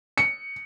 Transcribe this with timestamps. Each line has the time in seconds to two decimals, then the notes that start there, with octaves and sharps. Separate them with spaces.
0.18 C#7